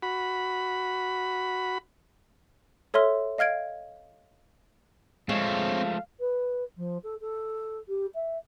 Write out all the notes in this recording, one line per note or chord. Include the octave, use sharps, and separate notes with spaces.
F#4 B5
A4 C#5 E5 C6 F6
D#5 F5 F6 G#6 D7
F3 G#3 A3 C4 C#5 F5
B4
F3
A4
A4
G4
E5